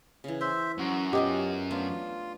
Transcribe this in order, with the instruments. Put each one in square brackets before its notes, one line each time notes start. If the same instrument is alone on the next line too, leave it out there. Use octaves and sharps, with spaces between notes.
[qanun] C#3 E3
[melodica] C5 E5 [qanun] C6
[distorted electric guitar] F#2 [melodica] F#4
[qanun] B3 C#4 F4 [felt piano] G4 D#5
[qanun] A3 B3 D4 [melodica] F4